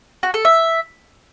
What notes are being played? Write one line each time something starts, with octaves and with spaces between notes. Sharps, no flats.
F#4
A4
E5